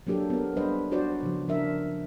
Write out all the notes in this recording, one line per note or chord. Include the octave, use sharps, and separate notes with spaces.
F#3 A#3 D4 G4 A4
B3 A#4
G3 D4 B4 C5 D#5
D4 F#4 C5 D5
C#3 F3
F3 D4 A#4 E5